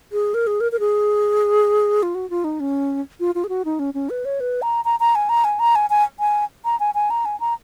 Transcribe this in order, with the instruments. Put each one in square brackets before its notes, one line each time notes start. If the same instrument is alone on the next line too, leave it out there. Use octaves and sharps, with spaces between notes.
[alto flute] G#4
A#4
G#4
A#4
A#4
G#4
F4
F#4
F4
D#4
C#4
F4
F4
G#4
F#4
D#4
C#4
C#4
B4
C#5
B4
A#5
A#5
A#5
G#5
A#5
G#5
A#5
G#5
G#5
G#5
A#5
G#5
G#5
A#5
G#5
A#5